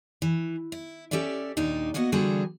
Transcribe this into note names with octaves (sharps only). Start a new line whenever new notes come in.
E3
E4
C#4 G4 A4 D5 E5
D#2 A#2 D4 D#4 A#5
A#3 B3 F#4 D#5 F#5
D3 E3 G3 F4 F#4 G#4